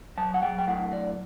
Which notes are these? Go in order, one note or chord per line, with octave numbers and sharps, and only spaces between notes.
F#3 A5
F#5
F#3 G5
G5
A2 F#5
F#3 D5